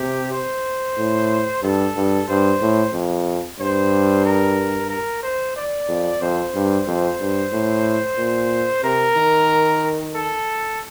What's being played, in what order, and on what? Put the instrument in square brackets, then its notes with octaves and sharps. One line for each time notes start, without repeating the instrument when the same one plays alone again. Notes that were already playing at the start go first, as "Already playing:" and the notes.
Already playing: [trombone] C3 [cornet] G4
[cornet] C5
[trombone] A2
[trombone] G2 [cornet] A4
[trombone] G2
[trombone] G2 [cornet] C5
[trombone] A2
F2
[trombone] G2 [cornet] C5
[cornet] A#4
A#4
C5
D5
[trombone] F2
[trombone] F2 [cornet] C5
[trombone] G2
F2
G2
A2
A#2
[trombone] C3 [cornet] A#4
[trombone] D#3
[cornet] A4